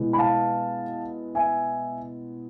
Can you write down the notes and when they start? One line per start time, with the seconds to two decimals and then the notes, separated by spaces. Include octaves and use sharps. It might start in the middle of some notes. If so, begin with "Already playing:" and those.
Already playing: B2 G#3 B3 E4
0.13 B5
0.18 F5 A5
1.35 E5 G#5